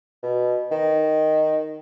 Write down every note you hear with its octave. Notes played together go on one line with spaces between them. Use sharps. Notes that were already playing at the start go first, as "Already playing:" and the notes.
B2
D#3